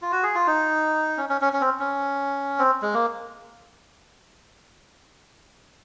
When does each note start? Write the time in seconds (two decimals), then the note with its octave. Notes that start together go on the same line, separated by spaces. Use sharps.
0.02 F4
0.12 F#4
0.23 G#4
0.35 F4
0.47 D#4
1.17 C#4
1.29 C#4
1.41 C#4
1.53 C#4
1.61 C4
1.79 C#4
2.59 C4
2.82 G#3
2.94 A#3